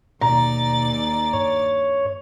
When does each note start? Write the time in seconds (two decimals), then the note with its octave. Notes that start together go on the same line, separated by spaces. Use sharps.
0.21 D#2 B2 D5 A#5 A6
1.33 G2 C#5